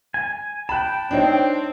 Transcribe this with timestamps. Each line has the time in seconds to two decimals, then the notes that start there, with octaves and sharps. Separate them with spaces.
0.14 G#5
0.69 G5 A5 B5 F#6
1.11 C4 D4 D#4 C#5